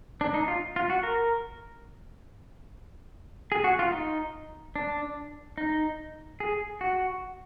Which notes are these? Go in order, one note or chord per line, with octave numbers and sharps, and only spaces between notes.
D4
D#4
F4
F4
F#4
A#4
G#4
F#4
F4
D#4
D4
D#4
G#4
F#4